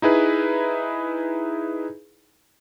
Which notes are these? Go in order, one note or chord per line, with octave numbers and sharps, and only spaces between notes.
D#4 E4 G#4 B4